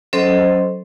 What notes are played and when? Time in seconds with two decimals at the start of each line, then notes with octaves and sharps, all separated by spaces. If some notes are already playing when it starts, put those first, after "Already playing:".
0.13 F#3 C#4 A4 C5 D#5 C6